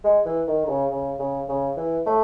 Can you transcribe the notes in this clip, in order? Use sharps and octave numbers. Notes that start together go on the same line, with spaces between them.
G#3
E3
D#3
D#3
C#3
C#3
C#3
C#3
E3
A3